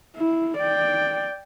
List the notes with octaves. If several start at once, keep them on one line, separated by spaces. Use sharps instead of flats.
E4
D5 G5